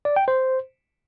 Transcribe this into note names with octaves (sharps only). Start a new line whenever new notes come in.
D5
G5
C5